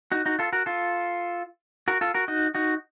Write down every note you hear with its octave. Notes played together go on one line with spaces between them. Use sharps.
D#4 F#4
D#4 F#4
F4 A4
F#4 A#4
F4 A4
F#4 A#4
F4 A4
F#4 A#4
D#4 F#4
D#4 F#4